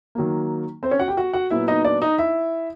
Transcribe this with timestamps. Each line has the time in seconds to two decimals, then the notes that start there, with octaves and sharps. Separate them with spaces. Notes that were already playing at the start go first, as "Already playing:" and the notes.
0.15 D#3 F#3 A#3
0.83 C4 C5
0.91 C#4 C#5
0.99 F#4 F#5
1.08 G4 G5
1.17 F#4 F#5
1.33 F#4 F#5
1.50 A#2 F#3 B3 E4 E5
1.68 D#4 D#5
1.85 D4 D5
2.02 D#4 D#5
2.18 E4 E5